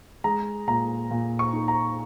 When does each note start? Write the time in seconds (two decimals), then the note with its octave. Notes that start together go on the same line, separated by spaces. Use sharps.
0.24 G#3 A#5
0.68 A#2 A#5
1.11 A#2
1.39 C#6
1.53 D#4
1.68 A#5